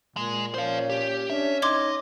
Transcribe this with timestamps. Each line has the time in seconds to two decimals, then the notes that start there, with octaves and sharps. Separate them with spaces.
0.17 A#2 G#3
0.54 C#4 C5 F5
0.90 G4
1.30 C#4 D4 E5
1.62 D#4 D#5 C6 D6 G#6